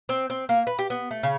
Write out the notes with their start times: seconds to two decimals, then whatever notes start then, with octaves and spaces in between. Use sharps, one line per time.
0.09 C4
0.30 C4
0.49 A#3
0.67 B4
0.79 G4
0.90 B3
1.11 A3
1.23 C#3